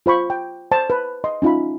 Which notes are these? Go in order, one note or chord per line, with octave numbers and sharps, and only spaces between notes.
F4 C5 B5 C#6
G5
C5 A5
B4
D#5 C6
C#4 D#4 F4 E5 B5